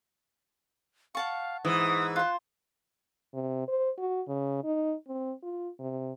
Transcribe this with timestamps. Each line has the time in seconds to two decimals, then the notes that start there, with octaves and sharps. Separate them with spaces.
1.15 F5 F#5 A5 C#6
1.65 G#2 E3 D#6
2.16 F4 C5 F#6
3.34 C3
3.68 C5
3.98 F#4
4.28 C#3
4.64 D#4
5.07 C4
5.43 F4
5.79 C3